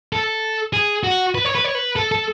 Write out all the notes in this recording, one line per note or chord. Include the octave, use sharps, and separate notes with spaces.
A4
G#4
F#4
B4
C#5
B4
C#5
B4
A4
A4